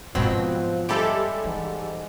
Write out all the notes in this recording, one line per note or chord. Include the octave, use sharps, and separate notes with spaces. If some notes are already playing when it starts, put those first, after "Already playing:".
G#2 B2 F3 F#3 B3 C4
G3 G#3 E4 G4 A4
G#2 E3